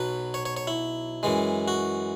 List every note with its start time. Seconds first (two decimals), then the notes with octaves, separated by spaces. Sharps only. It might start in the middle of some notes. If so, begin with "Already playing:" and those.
Already playing: B1 B2 F#3 B4
0.34 C#5
0.46 C#5
0.57 C#5
0.67 E4
1.23 F#2 E3 G#3
1.68 F#4